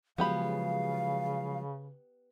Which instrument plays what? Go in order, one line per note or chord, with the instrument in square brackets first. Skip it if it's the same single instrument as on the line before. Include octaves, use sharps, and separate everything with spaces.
[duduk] C#3 [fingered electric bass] F3 F#3 G#3 [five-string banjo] B3 G4 B5 [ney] F5